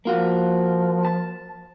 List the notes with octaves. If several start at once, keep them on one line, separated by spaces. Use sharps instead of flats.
F3 A#3 F4 F#4
A5